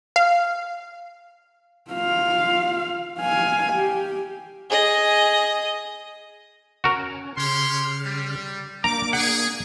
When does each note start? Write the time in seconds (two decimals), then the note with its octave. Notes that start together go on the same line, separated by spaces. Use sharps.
0.16 F5
1.91 F4 F5
3.19 F5 G#5
3.72 G4
4.70 G#4 D#5
6.84 C#4 F#4 A#4
7.37 C#3 G4 C#5 C6 F6
8.04 G3
8.84 A#3 D4 A#5 D6
9.13 G#4 F#5